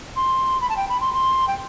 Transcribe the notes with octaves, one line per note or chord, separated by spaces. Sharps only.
C6
B5
A5
G5
B5
C6
C6
G5